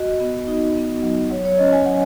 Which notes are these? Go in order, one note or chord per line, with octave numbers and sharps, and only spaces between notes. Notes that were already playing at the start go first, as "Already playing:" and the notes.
Already playing: F#4 D#5
B3
D#4
B3
F#3
F#3 C#5
C#5
C#4 D#5
G#5
F#3 F#5